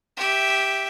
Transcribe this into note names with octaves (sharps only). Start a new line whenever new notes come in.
G4 E5